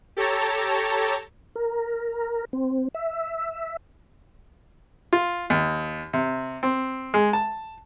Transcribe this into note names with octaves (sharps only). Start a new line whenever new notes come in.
G4 A4 C#5 A5 A#5
A#4
C4
E5
F4
D#2
C3
C4
G#3
A5